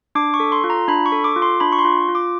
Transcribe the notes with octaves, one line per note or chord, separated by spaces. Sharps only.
D4 D6
C#6
A4
C6
F4
A#5
D4 B5
C#6
A4
D6
F4
C6
D4 B5
C#6
C6
F4
F4
D6